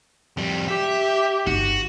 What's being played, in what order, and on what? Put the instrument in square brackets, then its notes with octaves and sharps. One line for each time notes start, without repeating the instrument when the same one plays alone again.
[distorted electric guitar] F2 G3
[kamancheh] G4 [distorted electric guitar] E5
[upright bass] G1 D#4 [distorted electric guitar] F#4